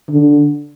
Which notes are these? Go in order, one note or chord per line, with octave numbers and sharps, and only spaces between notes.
D3